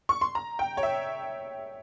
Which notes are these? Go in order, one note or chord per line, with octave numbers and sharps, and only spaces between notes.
C#6
C6
A#5
G5
C#5
E5